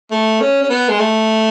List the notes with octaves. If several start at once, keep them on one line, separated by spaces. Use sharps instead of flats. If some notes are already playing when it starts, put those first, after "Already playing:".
A3
C#4
C#4
B3
G#3
A3